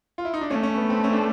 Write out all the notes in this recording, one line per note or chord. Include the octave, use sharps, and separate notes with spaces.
F4
E4
D#4
D4
A3 C#4
C#4
B3
C4
C#4
D4